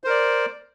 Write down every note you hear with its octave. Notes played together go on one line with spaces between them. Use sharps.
A#4 C5 D5